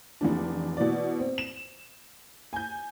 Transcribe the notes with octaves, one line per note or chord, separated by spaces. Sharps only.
F1 E2 D4
B2 E3 D5
C4
E7
G#5 G6